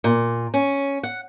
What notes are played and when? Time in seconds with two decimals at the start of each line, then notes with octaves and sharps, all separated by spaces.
0.04 A#2
0.54 C#4
1.03 F#5